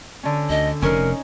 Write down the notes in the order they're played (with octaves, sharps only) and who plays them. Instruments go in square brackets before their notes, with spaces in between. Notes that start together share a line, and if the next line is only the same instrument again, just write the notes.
[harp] D3 C#4
[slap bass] D2 [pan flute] D#5
[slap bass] F1 C3 [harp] C#4 D#4 [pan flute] A#4